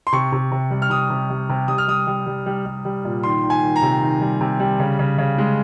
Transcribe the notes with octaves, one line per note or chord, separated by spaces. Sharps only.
C6
C3 C#6
C3
C3
G3
F6
C3 D#6
C3
G3
C3
G3 D#6
F6
G3 D#6
G3
G3
G3
G3
G3
A#2
D#3 C6
D#3
G#5
D#3
A#5
C3
D#3
G3
C3
G3
C#3
C#3
C#3
G#3